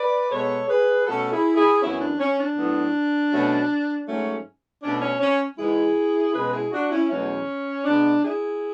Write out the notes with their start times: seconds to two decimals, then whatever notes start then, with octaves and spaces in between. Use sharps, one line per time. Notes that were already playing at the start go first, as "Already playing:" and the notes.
Already playing: B4 D5
0.30 B2 G#3 B3 A4 C#5
0.68 G#4 B4
1.06 B2 A3 C#4 F#4 A4
1.31 E4 G#4
1.56 E4 G#4
1.82 F#2 E3 B3 C#4 E4
2.01 D4
2.19 C#4
2.38 D4
2.57 A2 F#3 B3
3.32 B2 F#3 A3 C#4
4.08 G#2 F#3 A3 C#4
4.83 B2 A3 C#4 D4
5.02 C#4
5.21 C#4
5.59 G#2 E3 G#3 E4 G#4
6.34 B2 G#3 C#4 G#4 B4
6.53 E4 G#4
6.72 D4 F#4
6.90 C#4 E4
7.10 E2 B2 F#3 A3 C#4
7.85 B2 G#3 B3 D4
8.23 E4 G#4